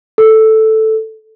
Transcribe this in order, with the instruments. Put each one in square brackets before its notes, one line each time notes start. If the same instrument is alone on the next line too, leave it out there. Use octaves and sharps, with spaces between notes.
[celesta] A4